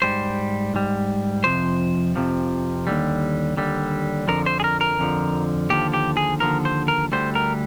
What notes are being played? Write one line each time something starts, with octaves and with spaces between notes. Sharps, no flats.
G#2 G3 C5
G#2 G3
F2 C3 F3 C5
F2 C3 F3
D#2 D3 G3
D#2 D3 G3
F2 D3 F3 A#4
C5
G#4
A#4
A#4
F2 D3 F3
D#2 D3 F3 G4
G4
G#4
D#2 D3 F3 A#4
C5
A#4
D2 D3 G3 C5
A#4